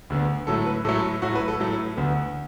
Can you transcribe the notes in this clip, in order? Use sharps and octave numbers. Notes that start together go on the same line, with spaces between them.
D2 D3 B3
A2 F#3 A3 A4
B4
A2 F#3 A3 A4
A2 F#3 A3 F#4
B4
A4
A2 F#3 A3
D2 D3 B3